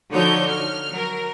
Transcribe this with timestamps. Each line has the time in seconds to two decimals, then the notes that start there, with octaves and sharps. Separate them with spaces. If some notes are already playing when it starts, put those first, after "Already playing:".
0.11 D3 F3 D#4 F#4 C#5 G6
0.49 F6
0.90 F#3 A#4